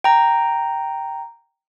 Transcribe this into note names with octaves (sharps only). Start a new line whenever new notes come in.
G5 A#5